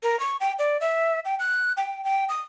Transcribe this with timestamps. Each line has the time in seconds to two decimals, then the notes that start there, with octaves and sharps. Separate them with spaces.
0.03 A#4
0.20 C#6
0.40 G5
0.59 D5
0.81 E5
1.25 G5
1.39 F#6
1.77 G5
2.05 G5
2.29 D#6